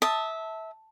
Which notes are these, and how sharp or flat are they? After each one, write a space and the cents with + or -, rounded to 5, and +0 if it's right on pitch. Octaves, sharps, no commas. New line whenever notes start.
E5 -20 A5 +0 D#6 +0